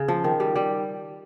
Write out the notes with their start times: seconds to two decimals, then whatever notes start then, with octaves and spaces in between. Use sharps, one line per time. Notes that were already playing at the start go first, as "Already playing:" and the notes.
Already playing: C#3
0.08 F3
0.24 D#3
0.40 G3
0.56 G3